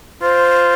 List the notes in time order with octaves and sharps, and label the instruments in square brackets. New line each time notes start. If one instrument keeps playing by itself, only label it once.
[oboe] F4 [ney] C5